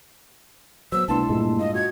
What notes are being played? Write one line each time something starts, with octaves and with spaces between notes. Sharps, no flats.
F#3 A3 B3 C5 E6
C2 A3 B3 D4 E4 A5 C6
G2 A#2 G#3
F4 D#5
F#4 G#6